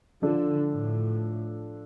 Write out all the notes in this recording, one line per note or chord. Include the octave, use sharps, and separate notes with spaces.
D3 F3 D4 F4 A4
A2